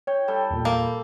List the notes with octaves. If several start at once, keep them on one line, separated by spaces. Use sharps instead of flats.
C#5 G5
G3 A4 G5
E2 A#2
A#3